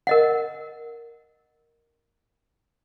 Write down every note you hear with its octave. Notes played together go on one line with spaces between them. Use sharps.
A#4 D#5 F#5